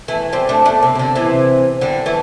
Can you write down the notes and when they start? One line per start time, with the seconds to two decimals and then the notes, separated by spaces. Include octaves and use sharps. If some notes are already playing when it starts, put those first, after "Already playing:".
0.08 E3 A3
0.33 G3 C4
0.49 A3 D4
0.65 A3 D4
0.82 C3
0.95 C3
0.99 D3
1.16 C3 E3
1.81 D3 G3
2.06 E3 A3